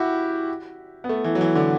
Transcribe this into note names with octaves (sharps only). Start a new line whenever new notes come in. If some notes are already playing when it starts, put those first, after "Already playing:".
Already playing: E4 F#4 G4
B3
A3
E3
F#3
E3
D3